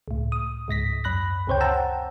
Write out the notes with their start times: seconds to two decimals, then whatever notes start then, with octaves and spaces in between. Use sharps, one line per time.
0.08 C#2 A2
0.32 D#6
0.68 C#2 G#2 A#6 B6
1.04 F#2 B5 F#6 A#6
1.47 C#2 C3 C5 C#5 G5
1.60 F#5 G5 A5 A#5 E6